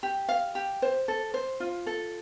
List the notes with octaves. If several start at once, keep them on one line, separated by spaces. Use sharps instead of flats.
G4
F5
G4
C5
A4
C5
F4
A4